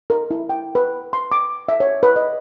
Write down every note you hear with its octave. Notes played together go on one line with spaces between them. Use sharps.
A#4
E4
G5
B4
C6
D6
E5
C#5
B4
D#5